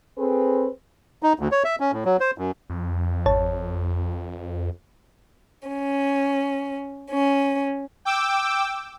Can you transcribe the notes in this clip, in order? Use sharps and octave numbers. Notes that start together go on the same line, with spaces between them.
C4 G#4 A4 B4
D#4
D2
C#5
E5
C#4
A2
F#3
C5
F#2
F2
G#1 C#5 A5
C#4
C#4
G5 D6 E6